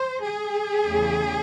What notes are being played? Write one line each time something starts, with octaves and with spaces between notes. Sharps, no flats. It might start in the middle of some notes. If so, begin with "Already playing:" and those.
Already playing: C5
G#4
E2 C#3 E3 A3